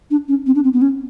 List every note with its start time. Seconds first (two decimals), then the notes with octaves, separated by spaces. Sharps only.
0.10 D4
0.28 C#4
0.46 C4
0.55 D4
0.64 C4
0.73 B3
0.82 C#4